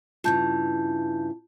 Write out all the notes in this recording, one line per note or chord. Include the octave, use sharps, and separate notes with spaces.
G2 C#3 E3 F4 A5 G6